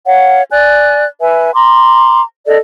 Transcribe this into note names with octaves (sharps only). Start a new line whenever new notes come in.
C#5 F5 F#5
D5 G#5 F#6
B4 E5 G#5
A#5 C6 D6
A4 D5 D#5